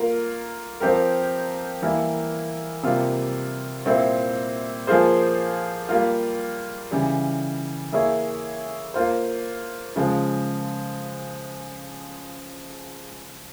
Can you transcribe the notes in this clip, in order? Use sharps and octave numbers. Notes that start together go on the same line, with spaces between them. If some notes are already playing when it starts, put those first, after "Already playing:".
Already playing: A#3 F4 A#4
F3 C4 G4 A#4
E3 G3 A#3 E4 A#4
C3 G3 A#3 F4
A#2 G3 C4 E4
F3 A#3 F4 G#4 C5
G3 A#3 F4
C#3 E3 G3
A#3 E4 G#4 C#5
A#3 F4 C5
C#3 F3 G#3